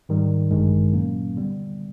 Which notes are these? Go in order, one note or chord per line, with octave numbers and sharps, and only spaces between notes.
G#2 D#3 G3
A1 G2 D#3 G#3
A#2 F#3 A#3 C#4
D3 G3 B3